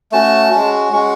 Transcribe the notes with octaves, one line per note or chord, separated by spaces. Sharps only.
A3 C#4 F#4 A5
G#3 C#4 F#4
G#3 C#4 F#4 C#6